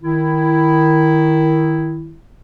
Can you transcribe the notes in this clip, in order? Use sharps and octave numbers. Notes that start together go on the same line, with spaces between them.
D#3 E4